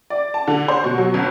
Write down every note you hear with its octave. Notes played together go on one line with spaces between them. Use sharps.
D5
A5
D3
C5
B2
F#3
G1